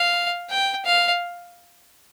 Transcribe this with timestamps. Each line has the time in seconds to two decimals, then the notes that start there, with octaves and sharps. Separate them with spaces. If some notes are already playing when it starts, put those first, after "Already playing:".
Already playing: F5
0.50 G5
0.85 F5